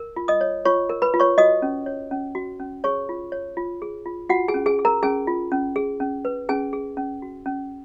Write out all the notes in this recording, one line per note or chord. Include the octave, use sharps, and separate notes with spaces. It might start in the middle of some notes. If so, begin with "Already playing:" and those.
Already playing: A#4
F4
D#5 D#6
C#5
F4 C#5 C#6
A#4
B4 B5
F4
C#5 C#6
F#4 D#5 D#6
C#4
C#5
C#4
F#4
C#4
G#4 C#5 C#6
F4
C#5
F4
G#4
F4
F4 F#4 F#5
G#4 G#5
C#4
G#4 G#5
G#4
A#4 A#5
C#4 G#4 G#5
F4
C#4
G#4
C#4
B4
C#4 G#4 G#5
G#4
C#4
F#4
C#4